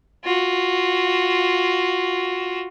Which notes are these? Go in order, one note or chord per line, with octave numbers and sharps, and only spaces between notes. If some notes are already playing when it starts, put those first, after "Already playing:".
F4 F#4